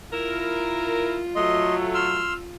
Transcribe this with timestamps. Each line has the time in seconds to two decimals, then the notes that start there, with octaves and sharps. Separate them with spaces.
0.12 E4 F4 A#4
1.36 F#3 A3 D#5 C6
1.94 C6 E6 F6